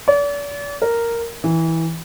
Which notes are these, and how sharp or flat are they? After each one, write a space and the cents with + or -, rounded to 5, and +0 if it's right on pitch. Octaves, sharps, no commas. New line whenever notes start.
D5 -40
A#4 -5
E3 -15